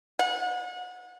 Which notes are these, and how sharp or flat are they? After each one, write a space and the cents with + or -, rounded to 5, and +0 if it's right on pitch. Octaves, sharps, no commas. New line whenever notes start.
F#5 -35